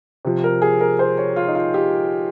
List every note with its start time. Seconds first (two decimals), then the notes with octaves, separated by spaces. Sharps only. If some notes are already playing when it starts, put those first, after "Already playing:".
0.25 C3 F3
0.44 A#4
0.62 G#4
0.81 A#4
0.99 C5
1.18 C#5
1.36 F4
1.48 D#4
1.55 F4
1.74 G4